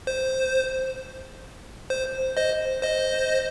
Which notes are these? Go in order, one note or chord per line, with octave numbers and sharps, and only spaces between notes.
C5
C5
C5 D#5
C5 D#5